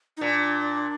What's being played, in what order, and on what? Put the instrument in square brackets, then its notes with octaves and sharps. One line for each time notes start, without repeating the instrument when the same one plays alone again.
[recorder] D#4
[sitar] A#2 [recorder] D4